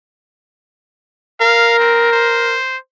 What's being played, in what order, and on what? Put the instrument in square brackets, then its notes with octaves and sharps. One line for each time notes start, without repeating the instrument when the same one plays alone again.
[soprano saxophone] A#4 [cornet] F5
[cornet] C4
C5